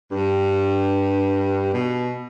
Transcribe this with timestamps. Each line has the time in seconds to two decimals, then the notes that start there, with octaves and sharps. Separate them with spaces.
0.11 G2
1.73 B2